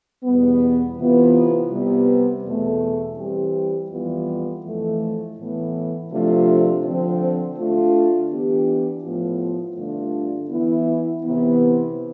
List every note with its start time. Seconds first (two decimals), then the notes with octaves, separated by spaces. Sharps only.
0.24 E2 B2 G3 B3
0.97 C3 E3 B3 F4
1.71 C3 G3 B3
2.44 E2 B2 A3
3.17 E3 G3 C4 G4
3.90 F2 E3 G3 B3 F4
4.63 F2 E3 A3
5.36 A2 E3 B3
6.10 C3 F3 A3 D4 F4
6.83 D3 F3 C4
7.56 D3 A3 D4 F4
8.30 E3 B3 D4 G4
9.03 A2 F3 B3 F4
9.76 G2 D3 A3 D4 F4
10.49 E3 B3 E4
11.23 C3 E3 B3